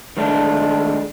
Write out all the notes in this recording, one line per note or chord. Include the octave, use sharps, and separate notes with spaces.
D#3 G#3 A3 D4